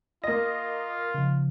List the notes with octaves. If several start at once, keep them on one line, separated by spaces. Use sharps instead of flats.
A#3 F4 D#5 A#6
C#3 F3